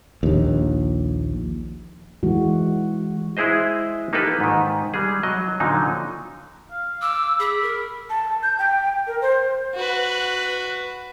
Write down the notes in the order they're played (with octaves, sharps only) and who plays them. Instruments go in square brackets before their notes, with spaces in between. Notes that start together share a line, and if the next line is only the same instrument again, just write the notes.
[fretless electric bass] A#1 D#2
[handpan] E3 G#3 F#4
[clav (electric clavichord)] G#3 E4 G#4 C5 D#5
A#3 D#4 F4 G4 A4 B4
G#2 D#3
G3 G#3 G#4
F#3 D#5
A#2 D3 F3 F#3 D#4
[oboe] F5
[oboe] D6 [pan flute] E6
[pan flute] G#4 [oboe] B5
[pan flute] A#4
[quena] A5
G6
G5
A#4
C5
[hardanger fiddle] F#4 B4